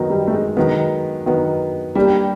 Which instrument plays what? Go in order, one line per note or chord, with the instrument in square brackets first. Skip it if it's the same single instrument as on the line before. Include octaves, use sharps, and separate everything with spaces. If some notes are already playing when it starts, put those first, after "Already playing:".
Already playing: [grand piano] D#3 F#3 B3 D#4
[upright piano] G3
A3
G#3
[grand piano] D#3 F#3 B3
D#3 F#3 B3
[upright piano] G3 [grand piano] A#3 D4 G4